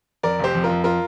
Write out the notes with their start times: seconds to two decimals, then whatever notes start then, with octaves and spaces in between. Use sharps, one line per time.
0.23 F2 A#4 D5
0.40 F1 G4 C5
0.55 F2
0.64 F4 A#4
0.69 F2
0.84 F4 A#4